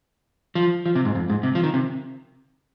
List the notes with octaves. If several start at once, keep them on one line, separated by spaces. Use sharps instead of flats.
F3
F3
C3
G#2
F2
G#2
C3
F3
D#3
C3